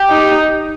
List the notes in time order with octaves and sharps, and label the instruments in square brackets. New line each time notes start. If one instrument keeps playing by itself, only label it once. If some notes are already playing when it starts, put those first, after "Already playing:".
Already playing: [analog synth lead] G4
[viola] D#4